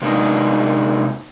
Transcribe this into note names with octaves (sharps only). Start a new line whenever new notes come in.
C3 G#3 A#3 B3 D4 D#4